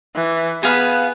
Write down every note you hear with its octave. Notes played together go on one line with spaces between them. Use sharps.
E3
B3 G#4 F5 B5